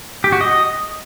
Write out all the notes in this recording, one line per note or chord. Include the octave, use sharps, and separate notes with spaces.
G4
F#4
D#5